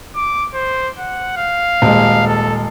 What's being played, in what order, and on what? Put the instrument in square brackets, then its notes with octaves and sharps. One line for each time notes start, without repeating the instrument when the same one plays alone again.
[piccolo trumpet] D6
C5
F#5
F5
[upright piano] D#1 G#3
[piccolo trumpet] A4